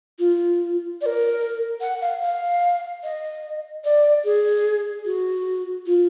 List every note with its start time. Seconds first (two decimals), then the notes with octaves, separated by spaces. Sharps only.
0.19 F4
1.01 D5
1.06 A#4
1.81 F#5
2.01 F5
2.22 F5
3.04 D#5
3.84 D5
4.24 G#4
5.05 F#4
5.86 F4